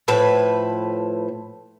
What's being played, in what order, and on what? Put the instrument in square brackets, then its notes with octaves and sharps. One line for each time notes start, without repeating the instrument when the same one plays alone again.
[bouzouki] A2 F3 B4 E5